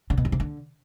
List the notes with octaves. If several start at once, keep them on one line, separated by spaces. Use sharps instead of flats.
D3
B2
F2
C3
D3